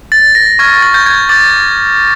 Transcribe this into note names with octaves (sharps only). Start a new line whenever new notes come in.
A6
A#6
C#6 F6 G#6
A6
G6
G#6
D6 G6 A6